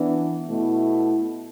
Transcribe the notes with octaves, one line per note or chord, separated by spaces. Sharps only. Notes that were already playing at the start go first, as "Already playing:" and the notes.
Already playing: E3 B3 D4
B2 A3 E4